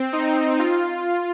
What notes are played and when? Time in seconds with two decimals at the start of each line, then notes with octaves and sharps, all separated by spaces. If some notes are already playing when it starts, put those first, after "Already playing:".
Already playing: C4
0.13 D#4
0.59 F4